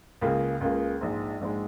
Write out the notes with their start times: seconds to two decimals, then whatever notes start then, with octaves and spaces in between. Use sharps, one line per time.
0.21 C#2 C#3 A#3 F4 G#4
0.61 C#2 C#3 A#3 F4 G#4
1.01 A#1 G#2 G#3
1.41 A#1 G#2 G#3